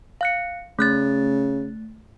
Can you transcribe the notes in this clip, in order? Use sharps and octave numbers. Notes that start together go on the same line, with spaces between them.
F5 F#6 C#7
C#3 A3 F#6 A6